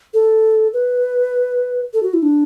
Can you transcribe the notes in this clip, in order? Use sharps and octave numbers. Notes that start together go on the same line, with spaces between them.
A4
B4
A4
F#4
E4
D4